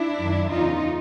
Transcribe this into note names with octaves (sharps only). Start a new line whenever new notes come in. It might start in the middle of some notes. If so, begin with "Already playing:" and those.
Already playing: D4 E4
F#2 D#3
E2 C#3 E3 D#4 F4